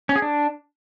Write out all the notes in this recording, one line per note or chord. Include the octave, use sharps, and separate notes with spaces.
C#4
G#4
D4